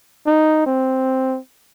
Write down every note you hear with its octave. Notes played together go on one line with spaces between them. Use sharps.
D#4
C4